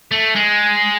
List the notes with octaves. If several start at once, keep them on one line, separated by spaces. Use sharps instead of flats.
A3
G#3